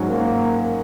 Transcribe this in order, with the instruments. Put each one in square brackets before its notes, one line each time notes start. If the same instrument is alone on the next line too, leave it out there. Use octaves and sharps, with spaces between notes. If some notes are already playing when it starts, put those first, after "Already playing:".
Already playing: [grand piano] G#2 F#3 C#4 F#4
[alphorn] A#3